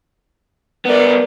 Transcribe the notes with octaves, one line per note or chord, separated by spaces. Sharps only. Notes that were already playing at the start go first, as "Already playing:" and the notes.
G3 B3 A#4 D5